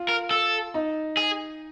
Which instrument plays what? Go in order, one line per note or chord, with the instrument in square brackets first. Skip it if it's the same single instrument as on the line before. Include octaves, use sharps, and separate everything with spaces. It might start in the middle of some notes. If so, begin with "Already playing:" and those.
Already playing: [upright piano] F4
[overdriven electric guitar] A#4
A4
[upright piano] D#4
[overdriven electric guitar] G#4